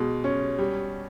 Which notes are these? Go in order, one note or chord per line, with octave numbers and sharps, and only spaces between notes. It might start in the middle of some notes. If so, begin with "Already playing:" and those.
Already playing: B2 G#3
C#4
G3